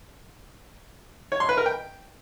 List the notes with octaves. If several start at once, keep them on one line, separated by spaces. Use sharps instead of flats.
C#5
C6
B4
A#4
G5